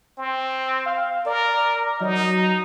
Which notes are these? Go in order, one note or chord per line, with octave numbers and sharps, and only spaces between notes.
C4
F5
A#4 D5
F#3 D#4